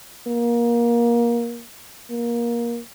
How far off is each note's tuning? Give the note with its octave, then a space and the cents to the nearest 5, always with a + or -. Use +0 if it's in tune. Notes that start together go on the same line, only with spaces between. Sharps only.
A#3 +20
A#3 +20